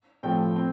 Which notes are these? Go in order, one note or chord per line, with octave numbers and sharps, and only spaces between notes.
A2 F3 A3 C4 G5
C4